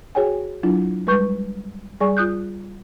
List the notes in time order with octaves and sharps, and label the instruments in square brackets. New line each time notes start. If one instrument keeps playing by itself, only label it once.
[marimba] F#4 G#4 C#5 G5 G#5
F#3 D4 E4 F4
G3 G#3 B4 C#6 G6
G3 G#4 D5 G#5 C#6
F4 D#6 F#6 G6